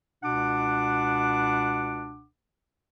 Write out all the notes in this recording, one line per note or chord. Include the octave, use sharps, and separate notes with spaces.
C#2 B2 D4 F#5 D6